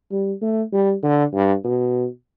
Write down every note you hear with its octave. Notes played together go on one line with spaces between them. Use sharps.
G3
A3
G3
D3
G2
B2